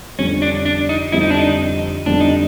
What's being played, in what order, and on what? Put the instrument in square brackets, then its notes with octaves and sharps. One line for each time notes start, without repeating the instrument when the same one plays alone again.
[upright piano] F2 D3 G3 C4 [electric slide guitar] C#4
[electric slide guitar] D4
D4
D#4
[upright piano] F2 D3 G3 C4 [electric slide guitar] E4
[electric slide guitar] D#4
D4
D#4
[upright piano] F2 D3 G3 C4 [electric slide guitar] D4
[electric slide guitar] D#4